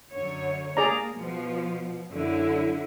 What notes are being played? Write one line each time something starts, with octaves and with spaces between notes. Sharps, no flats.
F#2 D3 C#5
A#3 G#4 D5 A#5
B2 F3
F#2 D3 E4